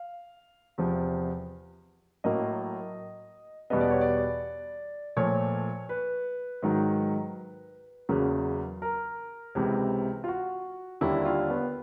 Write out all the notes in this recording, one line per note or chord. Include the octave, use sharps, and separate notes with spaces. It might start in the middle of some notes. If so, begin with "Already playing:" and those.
Already playing: F5
E2 C3 F3
A2 F#3 A#3 D#5
E2 B2 G3 B3 D#5
D5
C#5
D5
A#2 F3 A3 C#5
B4
G#2 D#3 F#3
E2 C#3 F#3 A#3
A#4
C#2 C3 E3
F4
F#4
D#2 D3 G3 A#3 E4
F4
B3